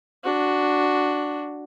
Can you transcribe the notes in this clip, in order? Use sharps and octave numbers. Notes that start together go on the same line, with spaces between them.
D4 F#4